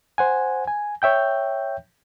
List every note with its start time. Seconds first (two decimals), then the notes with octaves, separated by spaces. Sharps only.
0.18 C5 F#5 G#5
0.67 G#5
1.02 C#5 E5 G5 G6